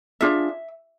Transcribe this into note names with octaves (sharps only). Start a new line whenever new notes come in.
D4 F4 G#4 E5